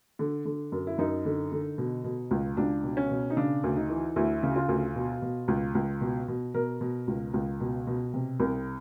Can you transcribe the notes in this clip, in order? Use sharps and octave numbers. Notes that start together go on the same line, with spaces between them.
D3
D3
F#2
E4
F#2 D#4
D3
D3
B2
B2
C#2
C#2 D4
B2
C#4
B2
D#4
C#3 D4
D2
D#4
E3
D2 E4
C#3
F4
D2
B2
B2
C#2
C#2
B2
B2
B2 A#4
B2
C#2
C#2
B2
B2
C3
C2